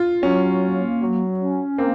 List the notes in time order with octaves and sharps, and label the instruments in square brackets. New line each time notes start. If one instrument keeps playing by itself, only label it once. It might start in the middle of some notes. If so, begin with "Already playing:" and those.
Already playing: [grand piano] F4
[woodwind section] F#3 [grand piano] C#4
[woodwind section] A#3
F#3
C#4
[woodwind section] A#3 [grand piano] C4